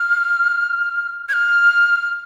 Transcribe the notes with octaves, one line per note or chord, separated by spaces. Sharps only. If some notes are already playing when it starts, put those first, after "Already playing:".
Already playing: F6
G#6
F6